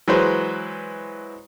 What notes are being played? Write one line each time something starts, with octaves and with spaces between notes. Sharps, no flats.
E3 F#3 G#3 B4 C5